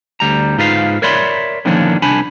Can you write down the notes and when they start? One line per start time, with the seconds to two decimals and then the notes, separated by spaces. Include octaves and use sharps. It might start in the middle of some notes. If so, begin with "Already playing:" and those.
0.20 D2 G3 A#5
0.58 G#2 D#4 F4 B4 D5 F5
1.02 A#4 C#5 D5 E5 B5 C6
1.65 D3 D#3 F3 A#3 C#4 D4
2.02 C2 D4 G#5 B5